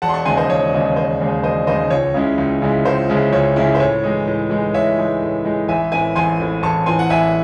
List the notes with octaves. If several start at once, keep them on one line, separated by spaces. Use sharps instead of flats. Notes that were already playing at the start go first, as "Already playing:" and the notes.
E1 F#5 A5
C6
A5 C#6
D#2 C#3 G#3 D#4 G#5 C6
C5 D#5
E1 C#5
D#2 C#3 G#3 D#4
E1 C5
D#2 C#3 G#3 D#4
E1 C5 D#5
D#2 C#3 G#3 D#4 C5 D#5
C#2 C#5
C#3 G#3 C#4 E4
C#2
C#3 G#3 C#4 E4
C#2 C5
C#3 G#3 C#4 E4
C#2 C#5
C#3 G#3 C#4 E4
C5
A2 C#5
E3 G#3 D#4
A2
E3 G#3 D#4
A2 C#5 E5
E3 G#3 D#4
A2
E3 G#3 D#4
A1 E5 G#5
A2 E3 C4 E5 G#5
A1 G#5 C6
A2 E3 C4
A1 A5 C#6
A2 E3 C4 G#5 C6
F#5
A1 E5 G#5